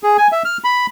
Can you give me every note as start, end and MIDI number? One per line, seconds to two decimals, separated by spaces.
0.03 0.17 68
0.18 0.27 80
0.32 0.43 76
0.45 0.57 89
0.64 0.86 83